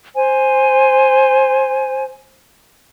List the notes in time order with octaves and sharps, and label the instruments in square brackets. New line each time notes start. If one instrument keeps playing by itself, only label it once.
[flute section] C5 G#5